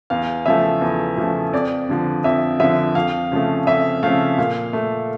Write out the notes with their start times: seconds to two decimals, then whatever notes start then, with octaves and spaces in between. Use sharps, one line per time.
0.10 E2 F5
0.45 C#3 F3 A3 E5
0.81 E2
1.17 C#3 F3 A3
1.53 F2 D5
1.89 D3 F3
2.24 F2 E5
2.60 D3 F3 E5
2.95 F2 F5
3.31 C#3 F3 A3
3.66 F2 E5
4.03 C#3 F3 A3 F5
4.38 A#2 F5
4.73 A3